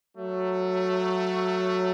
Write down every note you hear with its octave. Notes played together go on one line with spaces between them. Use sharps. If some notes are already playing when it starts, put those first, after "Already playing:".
F#3 A3